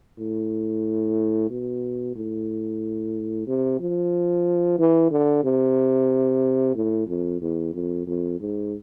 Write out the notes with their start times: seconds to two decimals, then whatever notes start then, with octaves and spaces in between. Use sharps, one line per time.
0.18 A2
1.50 B2
2.16 A2
3.47 C3
3.80 F3
4.79 E3
5.11 D3
5.44 C3
6.75 A2
7.08 F2
7.42 E2
7.74 F2
8.07 F2
8.40 G#2